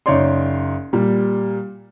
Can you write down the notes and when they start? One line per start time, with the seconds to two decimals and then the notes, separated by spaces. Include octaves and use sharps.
0.06 F#1 D#4 C#5 D5 C6
0.93 A#2 G3